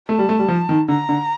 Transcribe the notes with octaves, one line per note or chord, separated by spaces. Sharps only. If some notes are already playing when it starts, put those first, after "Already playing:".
A3 A5
G3
A3
G3
F3
D#3
D3 A#5
D3